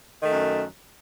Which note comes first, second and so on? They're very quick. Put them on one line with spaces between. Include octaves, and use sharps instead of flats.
D#3 A3 F#2